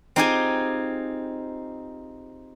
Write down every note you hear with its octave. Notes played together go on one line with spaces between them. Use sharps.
C4 D#4 F4 G4 G#4 G#5